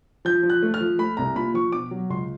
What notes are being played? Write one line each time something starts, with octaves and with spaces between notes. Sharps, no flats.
F3 G6
F3
F#6
A3
F6
F3
A3 B5
C2 A#5
A#2 B5
F3 C#6
B2 D6
F#3
C#2 C6